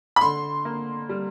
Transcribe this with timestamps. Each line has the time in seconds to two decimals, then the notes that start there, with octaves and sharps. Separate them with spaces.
0.16 B5
0.21 D3 C6
0.65 A#3
1.09 G3